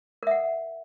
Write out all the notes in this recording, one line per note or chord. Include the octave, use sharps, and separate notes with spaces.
A#4 E5 F#5